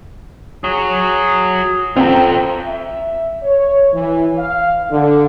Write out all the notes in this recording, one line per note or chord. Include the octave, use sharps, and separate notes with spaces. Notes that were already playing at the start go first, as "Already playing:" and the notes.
F#4 G#4 C#5
C4 F4 A4 G5 A#5
E5
C#5
E3
F5
D3